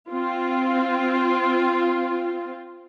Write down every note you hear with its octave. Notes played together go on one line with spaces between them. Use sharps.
C4 F4